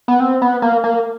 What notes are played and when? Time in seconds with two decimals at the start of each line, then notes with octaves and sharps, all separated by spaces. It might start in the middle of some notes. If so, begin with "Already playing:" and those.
0.08 B3
0.20 C4
0.42 B3
0.62 A#3
0.84 A#3